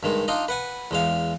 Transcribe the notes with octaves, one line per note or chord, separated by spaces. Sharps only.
G2 D#3 G#3
D4 D#4 F4 D#5
B4 F#5 G#5
E2 G#3 F5